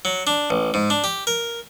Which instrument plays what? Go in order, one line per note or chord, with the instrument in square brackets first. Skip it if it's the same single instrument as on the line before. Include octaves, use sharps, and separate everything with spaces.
[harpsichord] F#3
D4
A1
G#2
D4
G4
A#4